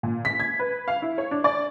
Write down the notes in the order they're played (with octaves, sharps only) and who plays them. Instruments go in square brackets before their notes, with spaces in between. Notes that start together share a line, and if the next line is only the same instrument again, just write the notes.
[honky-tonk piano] A#2
B6
G#6
B4
F5
E4
C#5
D4
D5